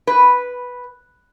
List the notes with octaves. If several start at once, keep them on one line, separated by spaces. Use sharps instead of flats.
B4